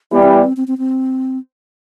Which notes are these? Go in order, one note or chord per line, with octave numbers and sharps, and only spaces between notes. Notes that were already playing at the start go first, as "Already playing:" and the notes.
E3 G3 B3
C4
B3
C4
C4
C4
C4